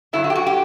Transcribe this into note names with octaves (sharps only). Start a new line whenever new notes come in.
G2 D3 F#3 E4
F#4
G4
F#4
G4